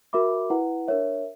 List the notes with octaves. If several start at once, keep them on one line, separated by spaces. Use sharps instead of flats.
F#4 A#4 E5 B5 D6
E4 B4 F#5
D4 A#4 C#5 E5